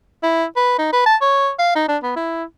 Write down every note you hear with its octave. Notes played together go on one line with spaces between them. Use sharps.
E4
B4
D#4
B4
A5
C#5
F5
D#4
D4
B3
E4